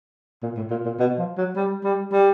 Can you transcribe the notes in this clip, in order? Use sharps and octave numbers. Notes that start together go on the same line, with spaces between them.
A#2
A2
A#2
A#2
B2
F3
F#3
G3
G3
G3